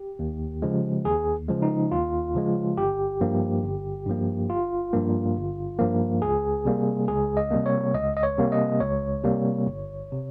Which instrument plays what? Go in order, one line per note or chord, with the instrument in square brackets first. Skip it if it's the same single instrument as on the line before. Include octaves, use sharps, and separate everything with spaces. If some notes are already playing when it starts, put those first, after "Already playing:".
Already playing: [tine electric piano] G4
D#2
C#3 F3 G#3
D#2 G#4
C#3 F3 G#3
D#4
D#2 F4
C#3 F3 G#3
G1 G4
G2 F3 A#3
G1
G2 F3 A#3
G1 F4
G2 F3 A#3
G1
G2 F3 A#3
C#2 G#4
C3 G3 A#3
C#2 G#4
D#5
C3 G3 A#3
C#5
C#2 D#5
D#5
C#5
C3 G3 A#3
D#5
C#2 C#5
C3 G3 A#3
G1
C3